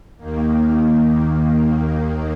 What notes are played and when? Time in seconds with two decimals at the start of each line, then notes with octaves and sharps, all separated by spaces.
0.18 D#2 D#3 A#3